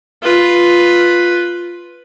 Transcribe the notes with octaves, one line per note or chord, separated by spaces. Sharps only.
F4 B4